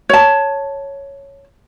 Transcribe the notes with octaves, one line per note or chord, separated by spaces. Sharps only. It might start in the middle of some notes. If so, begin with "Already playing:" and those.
C#5 A5